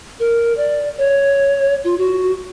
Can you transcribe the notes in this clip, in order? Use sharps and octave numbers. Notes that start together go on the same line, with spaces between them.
A#4
D5
C#5
F4
F#4